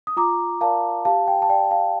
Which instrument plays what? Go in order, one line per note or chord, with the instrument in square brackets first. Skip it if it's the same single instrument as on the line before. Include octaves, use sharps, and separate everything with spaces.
[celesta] D#6
F4 A#5 D6
A#4 D5 F5 A5
G4 F5 A5
G5
A5
D5 G5
F5 A5